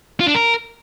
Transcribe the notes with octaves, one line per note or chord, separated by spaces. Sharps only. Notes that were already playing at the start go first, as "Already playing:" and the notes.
F4
D4
A#4